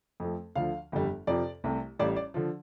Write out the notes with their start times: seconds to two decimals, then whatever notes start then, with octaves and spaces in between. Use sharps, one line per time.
0.20 F2 F3 A3
0.55 D2 D3 F3 F5
0.92 G1 F2 D3 G3
1.27 F2 C3 F3 D5
1.64 C2 C3 A3
1.99 A1 A2 G3 D5
2.16 D5
2.34 D3 F3